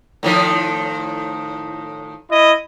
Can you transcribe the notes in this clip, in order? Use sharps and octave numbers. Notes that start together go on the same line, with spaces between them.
A2 D#3 F3
E4 D#5